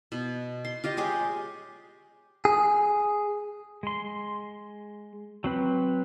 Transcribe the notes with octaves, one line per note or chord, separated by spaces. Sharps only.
B2
C6
F4 G4 D#5
G#3 G4 G#4 C#5
G#4
G#3 C6
F#3 C4 B4